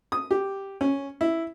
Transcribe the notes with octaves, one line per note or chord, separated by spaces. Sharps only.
D#6
G4
C#4
E4